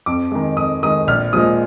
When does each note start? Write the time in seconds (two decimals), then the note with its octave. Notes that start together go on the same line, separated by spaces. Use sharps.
0.06 F2 D6
0.31 D#3 G#3
0.57 F2 D#6
0.83 D#3 G#3 D#6
1.07 A#1 F6
1.33 A#2 F3 G#3 D#6